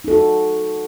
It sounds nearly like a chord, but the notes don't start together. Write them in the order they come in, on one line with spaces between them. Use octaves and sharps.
D#4 A4 F#4